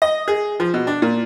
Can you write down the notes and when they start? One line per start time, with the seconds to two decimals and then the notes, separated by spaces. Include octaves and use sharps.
0.02 D#5
0.28 G#4
0.60 F3
0.74 B2
0.87 D4
1.02 A#2